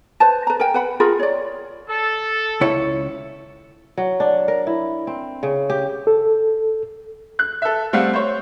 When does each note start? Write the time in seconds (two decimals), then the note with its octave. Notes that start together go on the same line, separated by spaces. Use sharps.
0.20 B4 C5 A5
0.47 B4 A#5
0.60 A#4 G5 G#5
0.74 B4 F#5 B5
1.00 F4 G#4 A#4 B5
1.19 C#5 D5
1.89 A4
2.61 C#2 E4 C#5
3.97 F#3
4.20 D4
4.48 A#4
4.67 E4
5.07 C4
5.43 C#3
5.70 G4
6.07 A4
7.39 F#6
7.62 A4 E5
7.93 G3 A3 C4 F5 F#5
8.13 C5 C#5